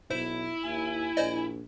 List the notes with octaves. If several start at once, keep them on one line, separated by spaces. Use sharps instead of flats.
B1 E4 C5
D#2 G#5
A#1 C5 D5 D#5